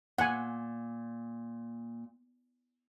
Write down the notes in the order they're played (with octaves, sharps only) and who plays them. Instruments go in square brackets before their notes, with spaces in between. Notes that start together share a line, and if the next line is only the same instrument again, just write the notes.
[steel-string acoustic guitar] A#2 [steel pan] F#5 G#5